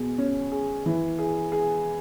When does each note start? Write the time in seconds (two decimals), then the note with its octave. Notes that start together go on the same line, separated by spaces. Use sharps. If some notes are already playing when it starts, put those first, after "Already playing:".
Already playing: B2 G#4
0.18 C#4
0.52 G#4
0.86 E3
1.18 G#4
1.52 G#4